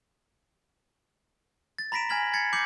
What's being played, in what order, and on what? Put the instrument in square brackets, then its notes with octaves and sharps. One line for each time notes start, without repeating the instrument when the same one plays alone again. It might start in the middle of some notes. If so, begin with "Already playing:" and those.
[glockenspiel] A6
A#5 B5 A#6 B6 D7 E7
G#5 A#5 F6 G#6 B6 F#7
G#6 A6 C7 C#7
D6 G6 C7 C#7 F#7